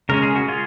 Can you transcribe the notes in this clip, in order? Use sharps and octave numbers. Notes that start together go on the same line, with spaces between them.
C#3 G#3 C#4 A#4
G#4
F#4
F4 G#4